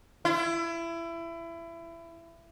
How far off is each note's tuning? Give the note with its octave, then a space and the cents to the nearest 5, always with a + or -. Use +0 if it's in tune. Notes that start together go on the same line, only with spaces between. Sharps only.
E4 +25